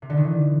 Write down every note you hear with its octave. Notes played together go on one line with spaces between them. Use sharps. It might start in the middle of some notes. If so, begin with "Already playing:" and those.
C3
D3
D#3
E3